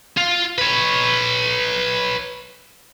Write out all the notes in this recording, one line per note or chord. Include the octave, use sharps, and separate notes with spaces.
F4
B4 C#5